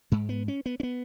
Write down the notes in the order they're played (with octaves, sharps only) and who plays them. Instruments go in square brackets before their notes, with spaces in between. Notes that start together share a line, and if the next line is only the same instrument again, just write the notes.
[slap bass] G#2 G#3
B3
C#4
B3
C#4
B3